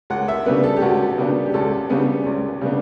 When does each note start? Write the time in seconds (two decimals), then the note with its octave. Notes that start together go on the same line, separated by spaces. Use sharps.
0.10 C#2 F#5
0.28 E5
0.46 C#3 G3 B3 D4 B4
0.63 A4
0.76 G4
0.81 C#2 F#4
1.18 C#3 G3 B3 D4
1.46 G4
1.54 C#2 A4
1.89 C#3 G3 B3 D4
2.26 C#2
2.61 C#3 G3 B3 D4